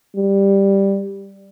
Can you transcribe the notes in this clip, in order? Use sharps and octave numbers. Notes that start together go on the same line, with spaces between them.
G3